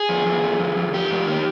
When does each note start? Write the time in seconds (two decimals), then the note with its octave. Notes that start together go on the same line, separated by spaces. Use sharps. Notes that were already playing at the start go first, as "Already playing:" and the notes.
Already playing: G#4
0.09 F2
0.26 F2
0.43 F2
0.60 F2
0.77 F2
0.93 F2 G4
1.11 F2
1.27 D#3